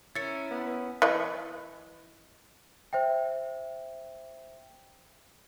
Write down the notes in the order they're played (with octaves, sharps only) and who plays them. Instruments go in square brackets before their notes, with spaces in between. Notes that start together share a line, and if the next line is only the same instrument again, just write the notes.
[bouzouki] C#4 A#4 [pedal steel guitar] E4 [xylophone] A6 C#7
[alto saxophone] B3
[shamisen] E3 D#5
[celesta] C5 E5 G5